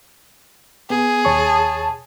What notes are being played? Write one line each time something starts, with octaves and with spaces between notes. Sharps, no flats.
B3 G#4
D#2 C#5 A5 C#6